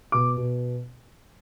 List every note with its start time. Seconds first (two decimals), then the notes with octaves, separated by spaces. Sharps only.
0.12 B2 D6
0.37 B2